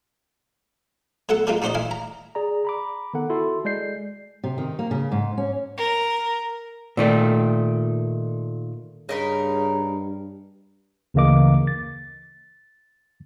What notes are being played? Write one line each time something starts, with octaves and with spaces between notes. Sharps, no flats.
F#3 A3 B3 A4 F#5
F3 F#3 G#3 A#3 C4 F4
F3 D#4 F#4 C5 D5 D#5
E4 F5 G#5
A#5
G#4 D5 A#5
A#5 B5 D6
D#3 B3 A4 F#5
E4 F#4 A4 C6
G#3 D5 G6 C7
C3
D#3
A#3
C#3
G#2
C#4
A#4
A#2 D#3 A3
G2 C#3 D#4 A#4 B5
D2 C#3 E3 A#3 D#5 D6
A6